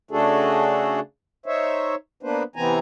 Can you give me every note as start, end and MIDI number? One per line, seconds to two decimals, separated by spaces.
0.11 1.00 49
0.11 1.00 57
0.11 1.00 62
0.11 1.00 66
0.11 1.00 68
0.11 1.00 69
1.46 1.95 63
1.46 1.95 72
1.46 1.95 73
1.46 1.95 76
2.23 2.43 58
2.23 2.43 59
2.23 2.43 62
2.23 2.43 71
2.23 2.43 72
2.56 2.79 48
2.56 2.79 52
2.56 2.79 59
2.56 2.79 60
2.56 2.79 80
2.56 2.79 82